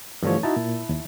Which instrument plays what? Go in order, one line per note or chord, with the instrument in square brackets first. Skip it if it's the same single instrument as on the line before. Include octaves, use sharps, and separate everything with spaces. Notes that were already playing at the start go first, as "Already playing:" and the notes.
[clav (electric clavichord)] G2 D3 F3 [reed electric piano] E3 A3 C#5
[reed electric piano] D#4 F#4 [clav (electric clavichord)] E4 A5
[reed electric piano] A#2
D#2